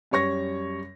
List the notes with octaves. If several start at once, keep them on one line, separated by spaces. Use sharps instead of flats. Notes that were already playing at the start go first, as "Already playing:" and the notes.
F#2 G3 C#5 C#6 A#6